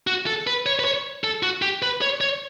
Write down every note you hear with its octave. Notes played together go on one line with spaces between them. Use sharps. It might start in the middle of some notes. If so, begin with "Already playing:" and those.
F#4
A4
B4
C#5
B4
C#5
A4
F#4
G4
B4
C#5
C#5